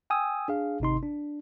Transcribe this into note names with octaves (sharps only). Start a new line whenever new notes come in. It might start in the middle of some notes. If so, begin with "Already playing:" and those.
G5 G#5 D#6 E6
D4 G#4 F5
G#1 C3 D#4 C6
D4